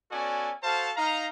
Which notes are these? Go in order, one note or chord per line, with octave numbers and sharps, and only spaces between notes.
B3 C#4 F#4 A4 D5 G#5
F#4 A4 C5 F5 A5
D#4 F5 A#5